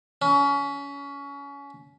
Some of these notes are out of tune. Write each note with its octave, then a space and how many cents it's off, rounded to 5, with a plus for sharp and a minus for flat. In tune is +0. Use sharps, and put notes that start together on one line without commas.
C#4 +25